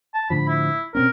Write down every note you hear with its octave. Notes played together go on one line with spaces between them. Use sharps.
A5
A2 D3 F3 B5
E4
B2 C4 C#4 A#4